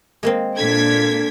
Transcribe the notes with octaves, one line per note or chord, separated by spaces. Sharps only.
G#3 A#3 C4
A#2 D4 A4 G#6 B6